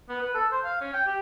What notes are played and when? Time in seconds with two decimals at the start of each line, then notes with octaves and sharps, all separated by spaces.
0.09 B3
0.21 B4
0.35 A4
0.51 C5
0.65 F5
0.81 C#4
0.94 G5
1.07 G4